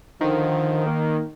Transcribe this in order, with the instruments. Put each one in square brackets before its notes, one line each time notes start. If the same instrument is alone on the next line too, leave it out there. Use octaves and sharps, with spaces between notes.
[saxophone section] D3 F3 [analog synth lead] D#3
[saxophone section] A#3